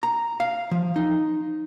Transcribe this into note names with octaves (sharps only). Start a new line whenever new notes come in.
A#5
F5
F3
D#4